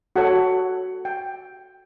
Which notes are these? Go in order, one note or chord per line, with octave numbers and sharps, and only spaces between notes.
F#4 A4 C#5 F#5
G5